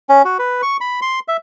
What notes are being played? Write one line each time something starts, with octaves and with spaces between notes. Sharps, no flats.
C#4
F#4
B4
C#6
B5
C6
E5